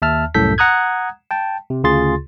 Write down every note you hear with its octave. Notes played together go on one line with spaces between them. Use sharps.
D#2 E5 A5 F6
C2 F#2 A2 A4 G6 B6
F#5 A#5 D#6 F#6 G#6
G5 A5
C3
D2 C#3 F4 G#4 C6 A6